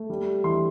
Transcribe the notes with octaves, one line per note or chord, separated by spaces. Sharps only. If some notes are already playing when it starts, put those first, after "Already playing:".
Already playing: A3
G3
E3 C6